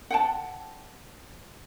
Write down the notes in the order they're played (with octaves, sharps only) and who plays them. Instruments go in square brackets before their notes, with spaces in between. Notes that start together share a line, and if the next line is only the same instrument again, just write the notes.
[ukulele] F#5 G5 A5